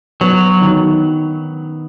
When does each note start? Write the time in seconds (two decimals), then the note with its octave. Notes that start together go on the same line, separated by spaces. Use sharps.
0.21 F#3 B3
0.61 D#3